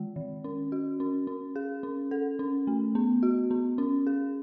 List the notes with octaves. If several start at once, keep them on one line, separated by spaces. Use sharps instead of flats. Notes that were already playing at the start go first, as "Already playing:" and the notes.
Already playing: D#3 G#3
D#3
C#4
F#4
C#4
C#4
G#4
C#4
A4
C#4
A3
B3
F#4
B3
C#4
G#4